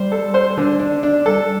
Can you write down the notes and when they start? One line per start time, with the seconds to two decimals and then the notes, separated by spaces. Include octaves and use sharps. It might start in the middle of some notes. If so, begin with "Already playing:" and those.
Already playing: G3 C5
0.12 A4
0.34 C5
0.57 D3
0.79 D4
1.03 D4
1.25 G3 A4